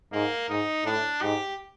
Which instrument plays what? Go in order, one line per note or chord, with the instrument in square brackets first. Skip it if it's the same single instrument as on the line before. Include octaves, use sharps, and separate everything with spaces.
[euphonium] G#2 [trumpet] A#3
[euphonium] G#2 [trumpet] D#4
[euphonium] A2 [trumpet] D4
[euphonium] G#2 [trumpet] G4